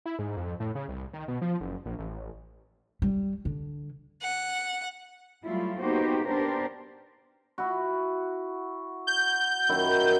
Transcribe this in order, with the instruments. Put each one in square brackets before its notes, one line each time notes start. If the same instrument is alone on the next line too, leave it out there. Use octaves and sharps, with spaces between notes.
[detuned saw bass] E4
G#2
F2
A2
C#3
C2
D#3
B2
F3
F#1
A#1
A1
[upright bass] G3
D3
[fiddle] F#5
[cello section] F#3 G3 A3 E4 F4
A#3 B3 D#4 F#4 G4 C5
B3 D4 G4 A#4 C5
[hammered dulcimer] E4 F#4
[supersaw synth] G6
[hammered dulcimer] F#2 D#3 E4